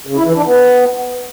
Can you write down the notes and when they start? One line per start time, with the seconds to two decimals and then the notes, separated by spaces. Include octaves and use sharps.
0.07 C#3
0.16 E4
0.26 E3
0.35 D4
0.45 B3